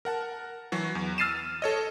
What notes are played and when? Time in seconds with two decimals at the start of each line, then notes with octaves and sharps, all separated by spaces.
0.05 A#4 F#5 A5
0.72 E3 F#3 F#4
0.95 E2
1.18 E6 F6 A6 C7 D#7 E7
1.62 A4 C#5 D#5